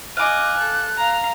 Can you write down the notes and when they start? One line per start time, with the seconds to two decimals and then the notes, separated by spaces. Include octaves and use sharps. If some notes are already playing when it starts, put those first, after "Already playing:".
0.17 D#5 F5 G#5 D6 F#6
0.59 A4
0.97 F5 A#5